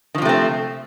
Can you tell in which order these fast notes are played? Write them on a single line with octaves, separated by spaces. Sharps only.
D#3 F3 C3 A3 C4